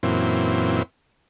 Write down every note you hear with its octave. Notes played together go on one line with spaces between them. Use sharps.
F#2 A#2 E3 C4